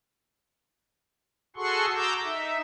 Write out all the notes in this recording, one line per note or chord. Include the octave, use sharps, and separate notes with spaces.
F#4 G#4 A4 F#5 C6 C#6
A#5 D6 E6 G6
D#4 E5